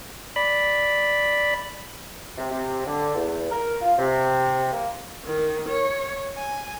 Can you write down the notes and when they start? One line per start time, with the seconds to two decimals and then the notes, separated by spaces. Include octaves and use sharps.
0.36 D5 B5
2.37 C3
2.50 C3
2.87 D3
3.15 E2
3.51 A#4
3.82 F4
3.99 C3
4.72 A#3
5.25 D#3
5.69 C#5
6.36 G#5